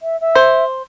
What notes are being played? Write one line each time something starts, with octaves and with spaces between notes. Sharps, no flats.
E5
E5
C5